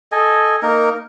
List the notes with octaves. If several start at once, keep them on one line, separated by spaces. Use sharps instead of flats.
A4 D#5 G#5
A#3 D#4 A#4